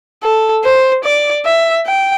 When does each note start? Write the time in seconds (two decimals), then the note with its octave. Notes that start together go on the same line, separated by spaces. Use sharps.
0.23 A4
0.64 C5
1.04 D5
1.45 E5
1.86 G5